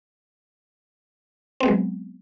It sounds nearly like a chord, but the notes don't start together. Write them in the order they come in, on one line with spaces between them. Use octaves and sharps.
C4 B3 G#3 F#3